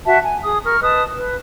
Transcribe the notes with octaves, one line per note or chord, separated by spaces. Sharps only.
F#4 E5 A5
G#5
G#4 D#6
A#4 C#6 F6
B4 D#5 A5 D#6
B4